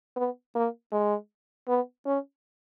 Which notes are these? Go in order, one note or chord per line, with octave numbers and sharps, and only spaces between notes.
B3
A#3
G#3
B3
C#4